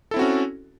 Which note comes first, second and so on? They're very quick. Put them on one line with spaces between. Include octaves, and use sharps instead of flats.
A4 E4 C4 F#4 C#4